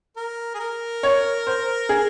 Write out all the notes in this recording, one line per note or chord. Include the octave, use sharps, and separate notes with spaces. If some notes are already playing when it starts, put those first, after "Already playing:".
A#4
G#4
A#4
C#5
C5
G#4